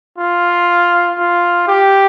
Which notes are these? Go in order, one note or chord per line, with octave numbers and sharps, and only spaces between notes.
F4
F4
G4